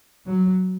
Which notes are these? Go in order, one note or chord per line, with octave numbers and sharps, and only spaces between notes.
F#3